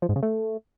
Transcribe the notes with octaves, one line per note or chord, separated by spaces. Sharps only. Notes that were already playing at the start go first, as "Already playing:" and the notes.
F3
G#2
C#3
A3